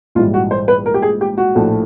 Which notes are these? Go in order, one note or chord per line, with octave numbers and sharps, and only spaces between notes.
A#1 G#2 E3 G3 F4
F#4
C5
B4
A#4
G4
G#4
G4
F#4
A#1 A2 F3 A3